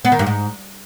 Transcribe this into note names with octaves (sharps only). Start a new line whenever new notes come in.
B3
D#3
G2
G#2